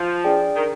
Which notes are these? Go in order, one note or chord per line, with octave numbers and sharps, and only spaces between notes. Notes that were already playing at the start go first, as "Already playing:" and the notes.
Already playing: F3
D4 G#4 D5 G5
D#3